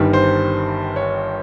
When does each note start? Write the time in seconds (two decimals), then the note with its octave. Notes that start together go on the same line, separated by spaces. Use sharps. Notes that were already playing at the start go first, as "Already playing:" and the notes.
Already playing: G1 G2 D#3 G3
0.13 C5
0.96 C#5